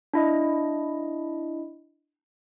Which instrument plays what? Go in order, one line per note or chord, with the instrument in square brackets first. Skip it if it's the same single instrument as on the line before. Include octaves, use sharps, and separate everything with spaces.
[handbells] D4 E4 D#5